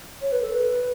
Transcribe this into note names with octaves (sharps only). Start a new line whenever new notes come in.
C#5
B4
A4
B4